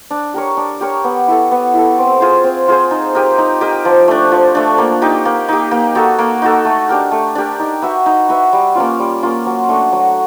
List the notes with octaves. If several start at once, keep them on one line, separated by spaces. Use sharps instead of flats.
D4
G4 A#4 C#5
D4
G4 A#4 C#5
B3
E4 A4
B3
E4 A4
C4
F4 G#4 C5
C4
F4 G#4 C5
D#4
G4 A#4 D#5
D#4
G4 A#4 D#5
F3
A3 D4
F3
A3 D4
A#3
D#4 G4
A#3
D#4 G4
A#3
D#4 F#4 A4
A#3
D#4 F#4 A4
A3
D4 G4 A#4
A3
D4 G4 A#4
D#4
F#4 B4 E5
D#4
F#4 B4 E5
G3
A#3 C#4 F4
G3
A#3 C#4 F4
F#3
A3 D4 F#4
F#3